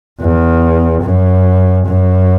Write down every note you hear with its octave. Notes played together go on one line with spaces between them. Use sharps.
E2
F#2
F#2